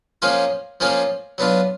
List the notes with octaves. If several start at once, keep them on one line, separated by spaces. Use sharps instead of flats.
F3 A#3 C#4 F4 G#4
F3 A#3 C#4 F4 G#4
F#3 B3 D4 F4